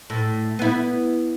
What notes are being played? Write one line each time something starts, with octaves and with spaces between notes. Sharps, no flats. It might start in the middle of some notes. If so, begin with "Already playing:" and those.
A2
B3 E4